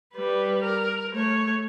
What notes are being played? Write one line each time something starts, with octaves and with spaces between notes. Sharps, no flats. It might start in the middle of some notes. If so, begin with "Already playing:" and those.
G3 B4
A#4
A3 C#5